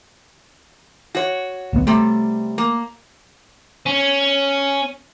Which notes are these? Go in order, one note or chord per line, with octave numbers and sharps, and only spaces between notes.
F#4 C#5
D1 B1 B3
C3 G3 A3
A#3
C#4